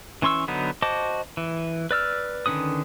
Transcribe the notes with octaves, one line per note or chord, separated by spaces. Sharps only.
E3 C#4 C6 C#6 E6
D3 F#3 B3 D#4
F#4 C5 D#5 A5 D6
E3
B4 D5 E6 F6
D3 D#3 C#4 B4 D#6